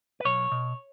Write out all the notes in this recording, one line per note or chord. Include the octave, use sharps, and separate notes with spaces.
B4
B1 C#5
B2